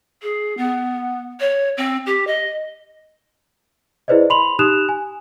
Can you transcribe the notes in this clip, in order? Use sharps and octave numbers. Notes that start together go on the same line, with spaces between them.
G#4
B3
C#5
C4
G4
D#5
E4 G#4 B4 C5 D5 D#5
B5 C6 F7 F#7
D#4 G4 D#6 F#6 E7 F7
G#5